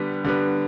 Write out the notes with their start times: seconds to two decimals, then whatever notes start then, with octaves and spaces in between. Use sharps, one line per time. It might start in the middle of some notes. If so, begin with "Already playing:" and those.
Already playing: D3 G3 B3
0.24 D3 G3 B3